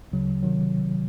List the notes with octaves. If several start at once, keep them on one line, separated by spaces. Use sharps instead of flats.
D2 C#3 F#3
C3 D#3 F#3